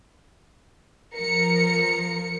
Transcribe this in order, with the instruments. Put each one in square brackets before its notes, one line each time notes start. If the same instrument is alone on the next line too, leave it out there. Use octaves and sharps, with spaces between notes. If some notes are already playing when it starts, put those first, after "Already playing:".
[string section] F3 A#4 C#7